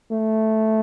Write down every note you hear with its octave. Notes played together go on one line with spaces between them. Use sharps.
A3